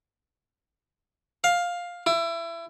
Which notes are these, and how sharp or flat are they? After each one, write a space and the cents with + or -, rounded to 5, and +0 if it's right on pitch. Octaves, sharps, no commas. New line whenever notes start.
F5 +10
E4 +25